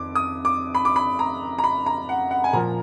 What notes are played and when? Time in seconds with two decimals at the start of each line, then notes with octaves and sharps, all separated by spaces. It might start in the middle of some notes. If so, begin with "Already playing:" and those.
Already playing: F2 D#3 D6
0.15 D#6
0.45 D6
0.75 B5
0.85 D6
0.96 B5
1.19 A#5
1.59 A#5
1.64 B5
1.86 A#5
2.09 F#5
2.31 F#5
2.44 G#5
2.53 A#2 F3 A#5